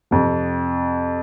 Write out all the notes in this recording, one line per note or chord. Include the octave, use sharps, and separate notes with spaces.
F2 C3 F3